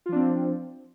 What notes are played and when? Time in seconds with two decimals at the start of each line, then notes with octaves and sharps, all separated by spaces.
0.06 F4
0.09 F3
0.12 D4
0.15 C4